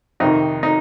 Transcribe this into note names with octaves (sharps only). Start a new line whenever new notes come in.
F2 C3 D#3 D#4
D#4